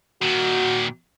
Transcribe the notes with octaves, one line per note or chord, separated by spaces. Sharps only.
A#2 D#3 F#4